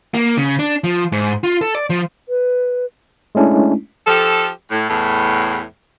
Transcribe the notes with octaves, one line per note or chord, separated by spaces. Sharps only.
A#3
C#3
D4
F3
G#2
F4
A4
D5
F3
B4
G#3 A3 C#4 D4 E4
F3 G4 A4
A2
E2 A2